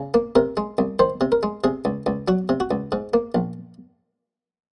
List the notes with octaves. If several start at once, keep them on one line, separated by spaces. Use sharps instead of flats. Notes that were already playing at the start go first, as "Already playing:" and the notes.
Already playing: C#3
A#3
C3 A#4
G#3
C2
D#3 C5
C3
A#4
G#3
C3 G#4
C#2
C#2
F#3 F#4
C3
F#4
C#2
G#2
A#3
A#1